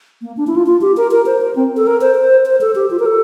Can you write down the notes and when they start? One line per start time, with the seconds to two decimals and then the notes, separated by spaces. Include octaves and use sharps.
0.22 A#3
0.37 D4
0.47 E4
0.56 F4
0.66 F4
0.81 G4
0.97 A#4
1.11 A#4
1.26 C5
1.41 A#4
1.56 C4
1.77 A4
1.87 A#4
2.01 C5
2.16 C5
2.46 C5
2.61 A4
2.75 G4
2.91 F4
2.99 A#4
3.06 A4